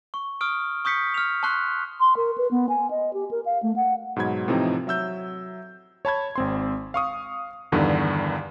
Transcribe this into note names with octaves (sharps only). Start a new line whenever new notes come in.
C#6
C#6 D#6 F6 D7
C#6 D#6 G6 B6 C#7
F6 F7
A5 C6 C#6 F#6 C7
C6
A#4
B4
B3
G#5
D#5
G4
A#4
F5
A3
F#5
G#2 B2 F#3 B5 G#6
A2 C3 E3 F3 C4 D#4
F#3 E5 E6 G6
C#5 A5 B5 G#6
G#1 C4 C6
F5 C#6 D#6
E2 G2 D3 D#3